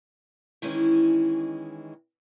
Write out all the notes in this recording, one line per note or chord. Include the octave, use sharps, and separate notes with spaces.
D#3 E3 G#3 C#4 E4